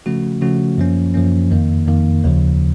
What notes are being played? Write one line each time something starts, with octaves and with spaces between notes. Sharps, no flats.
C#3 F3 A3 C#4 F#4
C#3 F3 A3 C#4 F#4
F#2 F3 A#3 C#4
F#2 F3 A#3 C#4
F2 D#3 A#3
F2 D#3 A#3
D#2 C#3 F3